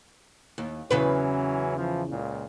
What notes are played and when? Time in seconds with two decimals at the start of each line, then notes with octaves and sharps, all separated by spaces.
0.58 D#2
0.91 E2 C#3 E3 F#3 C#4 B4
1.76 E3 F3
2.10 C#2 A#2